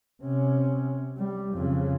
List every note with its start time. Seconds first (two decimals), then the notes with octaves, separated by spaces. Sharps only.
0.22 C3 C#4
1.17 G3
1.54 F2 C#3